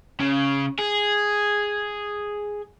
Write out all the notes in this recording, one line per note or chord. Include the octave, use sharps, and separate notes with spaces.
C#3
G#4